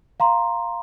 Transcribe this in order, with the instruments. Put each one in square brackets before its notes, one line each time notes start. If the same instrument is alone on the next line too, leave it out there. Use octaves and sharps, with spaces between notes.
[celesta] F5 A#5 C6